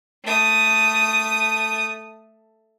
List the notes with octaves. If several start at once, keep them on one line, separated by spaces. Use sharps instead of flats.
A3 D#6